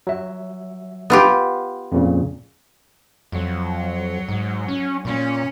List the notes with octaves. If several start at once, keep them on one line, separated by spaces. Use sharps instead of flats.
F#3 E5
B3 F4 G4
F2 A#2 C#3
F2 F#3
G#2
C#4
A#2 C#4